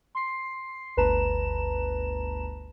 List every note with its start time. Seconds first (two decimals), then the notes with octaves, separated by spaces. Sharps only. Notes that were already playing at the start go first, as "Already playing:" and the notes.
0.15 C6 C7
0.97 G1 D2 B4 A5 A#5 E7